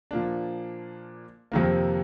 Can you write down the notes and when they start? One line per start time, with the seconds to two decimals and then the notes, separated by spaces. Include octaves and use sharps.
0.11 A#2 F3 A#3 D4
1.52 F2 C3 D#3 A#3